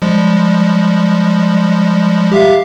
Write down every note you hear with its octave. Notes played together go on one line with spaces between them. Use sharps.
F3 G3 G#3
G4 E5 F5